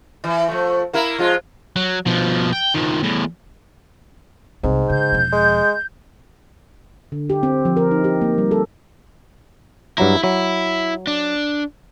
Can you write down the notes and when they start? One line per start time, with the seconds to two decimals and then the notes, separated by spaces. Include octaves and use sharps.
0.24 E3
0.48 F3 A3
0.93 A#3 E4 A#4
1.18 F3 G#3 F4
1.76 F#3
2.06 B2 F3
2.53 G5
2.75 D#3 F3
3.03 E2 A2
4.63 C2 G#2 C4
4.90 C#3 G6
5.12 E1 F3
5.32 G#3
7.12 D3
7.30 G4
7.43 C4
7.65 F3
7.77 A#4
7.91 D#4
8.04 G4
8.21 A#3
8.38 G3
8.51 A4
9.98 G2 F#3 E4 A#5
10.24 F#3 E4
11.07 D4